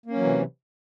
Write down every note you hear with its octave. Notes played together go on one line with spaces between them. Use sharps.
C3 E3 F#3 A#3 C#4